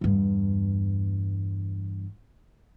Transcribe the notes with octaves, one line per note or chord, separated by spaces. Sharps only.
E2 G2